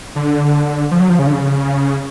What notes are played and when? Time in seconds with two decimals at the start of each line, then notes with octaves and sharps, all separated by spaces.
0.16 D3
0.91 F3
1.00 F#3
1.09 F3
1.19 C#3
1.27 D3
1.33 C#3